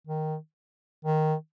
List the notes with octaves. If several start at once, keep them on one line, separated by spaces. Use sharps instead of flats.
D#3
D#3